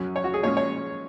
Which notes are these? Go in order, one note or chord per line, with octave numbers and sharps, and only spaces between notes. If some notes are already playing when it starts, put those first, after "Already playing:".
Already playing: F#2 F#3 C#4
C#5
F#4
G#4
A#2 G#3 C#4 C#5
C#5